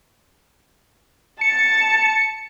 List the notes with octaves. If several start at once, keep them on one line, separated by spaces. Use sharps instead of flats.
A5 C#7